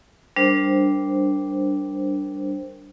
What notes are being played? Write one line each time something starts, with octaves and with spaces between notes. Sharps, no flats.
G3 D4 A#4 C5